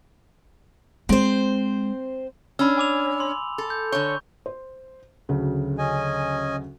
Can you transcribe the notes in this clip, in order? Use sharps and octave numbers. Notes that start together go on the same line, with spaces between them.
G#3 C4 C5
C#4 D4 B5 E6
G#5 D6 F7
C6
A4
G6
D3 C#5 C#6 G6
C5
D2 C#3 F#3
C#4 D#5 G#5